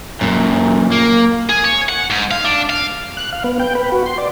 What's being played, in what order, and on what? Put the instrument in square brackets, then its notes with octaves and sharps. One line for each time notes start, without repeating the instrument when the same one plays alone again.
[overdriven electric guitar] F#2 A#2
A#3
[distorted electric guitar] G#4
C#5
F#5
G#2
F5
D4
F5
[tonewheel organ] F#6
F5
B3
G5
B4
F#4
C6
D5